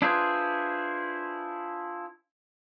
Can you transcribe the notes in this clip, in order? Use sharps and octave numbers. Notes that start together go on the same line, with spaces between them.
D4 E4 F4 G#4 B4 C5